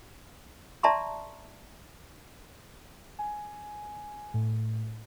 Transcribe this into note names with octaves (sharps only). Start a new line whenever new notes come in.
D5 E5 A5 A#5 C6 C#6
G#5
A2